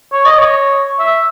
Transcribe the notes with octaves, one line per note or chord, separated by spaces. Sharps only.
C#5
D#5
C#5
E5